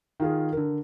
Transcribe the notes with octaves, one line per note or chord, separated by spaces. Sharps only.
D#3 F4 G#4
D3 A#4